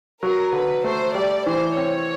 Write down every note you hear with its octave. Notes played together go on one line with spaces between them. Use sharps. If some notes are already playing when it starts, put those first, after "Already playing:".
F#3 A#4
D3 B4
A3 C5
G3 D5
E3 C5
C4 C#5